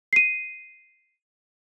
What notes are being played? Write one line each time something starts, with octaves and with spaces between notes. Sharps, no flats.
C7 D#7